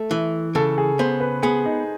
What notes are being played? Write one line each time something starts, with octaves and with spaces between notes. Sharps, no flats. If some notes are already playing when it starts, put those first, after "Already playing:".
Already playing: A3
E3
C#3 A4
G#4
B3 C5
B4
B3 G#4
D#4